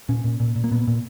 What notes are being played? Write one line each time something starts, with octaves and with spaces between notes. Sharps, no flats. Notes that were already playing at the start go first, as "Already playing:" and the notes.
A#2 C#4
A#2
A#2
A#2
A#3
A#2 B3
A#2